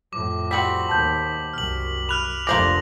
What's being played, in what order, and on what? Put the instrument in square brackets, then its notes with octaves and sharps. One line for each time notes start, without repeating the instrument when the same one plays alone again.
[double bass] F2 A2 [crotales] D6
[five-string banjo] G3 C4 F#4 [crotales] B6 F#7
[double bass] D#2 [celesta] A5 G6
[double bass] C2 F#2 [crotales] F6 F#7
[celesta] B5 [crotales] F6 F#6 F7
[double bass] F1 D3 [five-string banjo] A#3 C5 D5 [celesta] D6 [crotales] A#6 F#7